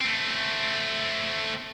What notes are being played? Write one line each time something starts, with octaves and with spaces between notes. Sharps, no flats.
A3 C4